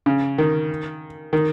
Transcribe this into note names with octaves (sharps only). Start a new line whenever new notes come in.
C#3
D#3
D#3